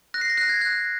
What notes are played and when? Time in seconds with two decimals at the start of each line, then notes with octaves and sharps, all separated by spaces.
0.14 F#6 A#6
0.21 C7
0.30 A#6
0.37 F#6
0.49 G#6
0.61 F#6